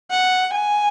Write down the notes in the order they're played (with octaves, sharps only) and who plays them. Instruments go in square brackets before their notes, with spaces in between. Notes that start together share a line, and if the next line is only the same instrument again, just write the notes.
[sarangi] F#5
G#5